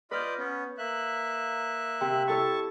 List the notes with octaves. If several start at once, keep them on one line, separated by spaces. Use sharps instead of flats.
F4 B4 D5 D#5 F6 G6
B3 C#4
A#3 E5 F#6
C3
E4 A4 C#5 A5 C#6